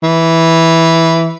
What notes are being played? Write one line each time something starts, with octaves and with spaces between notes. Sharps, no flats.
E3